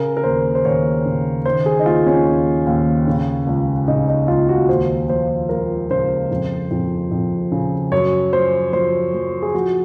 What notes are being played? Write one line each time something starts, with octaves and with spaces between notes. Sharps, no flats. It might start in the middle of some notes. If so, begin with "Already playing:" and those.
Already playing: C#3 A#4
A#4
D#2 C5
C5
D#2 C#5
C#3
D#3 C5
G#4
D#4
D#2 F4
C#4
D#2
D#2
C#3
C#2
C#3 D#4
D#4
C#2 F4
F#4
D#2 C5
F3 C5
F3 A#4
C#3 C5
F2
F2
F2
C#3
F#2 C#5
F3 C5
F3 C5
F3
G#4
F3 F#4